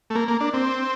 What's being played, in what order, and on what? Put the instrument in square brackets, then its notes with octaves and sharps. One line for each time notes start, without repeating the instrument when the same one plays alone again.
[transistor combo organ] A3
A#3
A#3
D4
C4